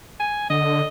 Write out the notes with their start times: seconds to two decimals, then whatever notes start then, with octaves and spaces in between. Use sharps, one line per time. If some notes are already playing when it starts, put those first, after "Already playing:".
0.20 G#5
0.50 D3 D#5